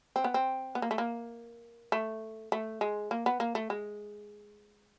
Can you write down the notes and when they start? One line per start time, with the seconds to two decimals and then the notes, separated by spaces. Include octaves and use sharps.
0.16 C4
0.24 B3
0.34 C4
0.75 B3
0.82 A#3
0.91 A3
0.98 A#3
1.92 A3
2.52 A3
2.81 G#3
3.11 A#3
3.26 B3
3.40 A#3
3.55 A3
3.70 G#3